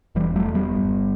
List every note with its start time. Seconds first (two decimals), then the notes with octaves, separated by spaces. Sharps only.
0.15 E1 E3 G3
0.36 F#3 A3
0.45 E1
0.55 G3 B3
0.75 G1